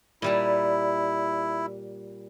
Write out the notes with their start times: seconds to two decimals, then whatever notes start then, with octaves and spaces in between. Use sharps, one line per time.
0.22 A#2 G3 E4 A5